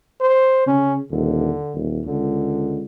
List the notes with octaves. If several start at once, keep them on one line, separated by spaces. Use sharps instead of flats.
C5
C#3 C#4
D#1 D3
D#1
C#2 D3